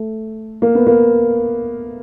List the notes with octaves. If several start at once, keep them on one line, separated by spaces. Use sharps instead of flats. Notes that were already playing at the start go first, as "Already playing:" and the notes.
Already playing: A3
A#3
B3
A#3